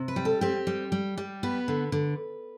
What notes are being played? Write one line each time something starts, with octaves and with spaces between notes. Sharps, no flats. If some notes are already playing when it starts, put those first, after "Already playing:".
Already playing: C3
B4
G3
A4
C4 G4
G3
G3
G3
B3 B4
D3
D3